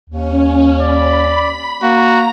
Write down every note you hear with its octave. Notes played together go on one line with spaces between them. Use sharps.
D#2 C#4
D5 B5
A#3 F#4 A#5